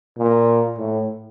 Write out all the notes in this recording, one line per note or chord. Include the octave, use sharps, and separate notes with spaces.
A#2
A2